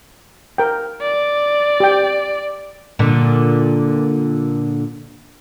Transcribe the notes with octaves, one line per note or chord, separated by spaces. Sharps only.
A#4 G5
D5
G4 G5
A#2 D3